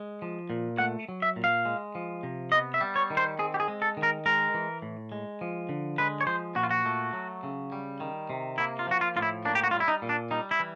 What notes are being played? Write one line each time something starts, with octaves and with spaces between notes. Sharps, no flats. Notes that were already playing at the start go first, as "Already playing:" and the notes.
Already playing: G#3
F3
A#2
A3 F#5
F#3
E5
A#2
F5
G#3
F3
C3
B3 D#5
E5
G3
C#5
D#3
C5
C4 G#4
G4
G#4
G#3
A4
D#3
A#4
G#3 A#4
E3
A2
G#3
F3
D3
G#3 B4
C#5
F3 C5
A#2 F#4
F4
F#4
A3
F#3
C#3
G3
D#3
C3
A#3 E4
F4
F3 F#4
F4
A2 F4
E4
A#3 D4
G4
F#4
G3 F4
E4
D#4
A#2
D4
G3 D#4
E4
E3